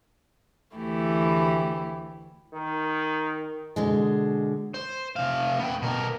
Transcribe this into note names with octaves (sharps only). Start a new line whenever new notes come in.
D2 E3 A3 E4 G4
D#3
B2 D3 G#3
C5
C3 F5
B3 G5
B2 A#4